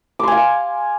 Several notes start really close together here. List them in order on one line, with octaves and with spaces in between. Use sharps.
D6 C6 G#5 F5